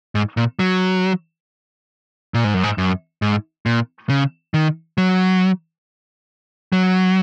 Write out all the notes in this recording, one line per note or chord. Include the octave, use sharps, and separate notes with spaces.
G#2
A#2
F#3
A#2
G#2
F#2
G#2
F#2
G#2
A#2
C#3
D#3
F#3
F#3